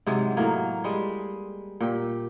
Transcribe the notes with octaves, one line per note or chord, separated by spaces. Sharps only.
G#2 C3 F#3 G#3
A2 F#3 A#3
G3 G#3
A#2 G4